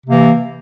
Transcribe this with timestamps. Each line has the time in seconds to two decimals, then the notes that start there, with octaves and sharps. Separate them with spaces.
0.05 C3
0.08 A#3
0.11 E3